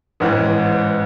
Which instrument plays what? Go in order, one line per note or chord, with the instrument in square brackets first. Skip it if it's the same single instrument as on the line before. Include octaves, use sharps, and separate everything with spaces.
[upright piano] A1 G#2 E3